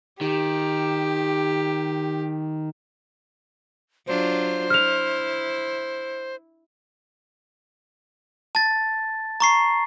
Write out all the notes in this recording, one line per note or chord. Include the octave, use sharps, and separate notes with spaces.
D#3 G4
F#3 D4 F4 C5
E4 F6 F7
A5 A6
A#5 C#6 C7